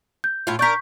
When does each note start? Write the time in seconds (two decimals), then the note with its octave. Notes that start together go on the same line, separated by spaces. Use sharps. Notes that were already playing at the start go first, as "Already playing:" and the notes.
0.24 G6
0.47 A2 F4
0.59 D4 A#4 C#6 G6 B6